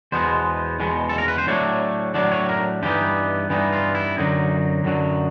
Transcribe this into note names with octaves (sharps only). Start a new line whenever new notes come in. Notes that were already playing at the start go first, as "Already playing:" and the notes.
E2 B2 G#3 B3 C5
E2 B2 G#3 B3
A4
A#4
B4
C5
A2 F#3 A3 D4 C#5
A2 F#3 A3 D4 D5
C#5
A#4
G2 E3 G3 B3 D#4 G4
G2 E3 G3 B3 D#4
F4
E4
F#2 D3 F#3 D#4
F#2 D3 F#3